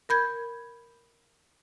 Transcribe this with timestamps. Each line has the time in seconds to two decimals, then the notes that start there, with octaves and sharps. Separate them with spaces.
0.09 A#4 B5 G6 G#6